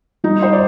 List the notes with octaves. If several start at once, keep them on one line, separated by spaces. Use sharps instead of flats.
G3 D#4
C5
D5